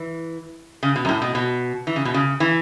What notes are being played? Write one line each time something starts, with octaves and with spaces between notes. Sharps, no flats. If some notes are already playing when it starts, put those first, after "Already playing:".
Already playing: E3
C#3
B2
F#2
A2
B2
B2
E3
C#3
B2
C#3
E3